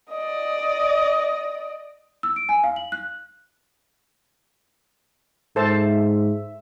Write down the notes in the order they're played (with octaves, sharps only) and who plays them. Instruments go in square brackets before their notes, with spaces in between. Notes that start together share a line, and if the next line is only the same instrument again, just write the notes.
[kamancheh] D5 D#5
[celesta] E6
D7
G#5
F5
F#7
F#6
[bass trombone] G#2 [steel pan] A4 C5 A5 [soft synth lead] E5